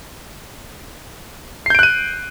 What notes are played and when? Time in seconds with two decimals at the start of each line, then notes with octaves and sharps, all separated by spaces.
1.66 C7
1.70 G6
1.75 D7
1.79 F#6
1.83 D#7